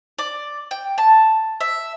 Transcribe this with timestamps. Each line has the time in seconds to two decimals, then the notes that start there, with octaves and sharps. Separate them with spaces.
0.18 D5
0.71 G5
0.98 A5
1.60 E5